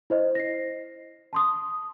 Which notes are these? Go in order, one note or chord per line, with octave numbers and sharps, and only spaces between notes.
E4 C5 D#5
A#6 C7
A5 C6 D#6